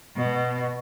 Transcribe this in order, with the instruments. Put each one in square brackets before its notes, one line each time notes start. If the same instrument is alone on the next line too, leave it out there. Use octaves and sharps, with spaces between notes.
[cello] B2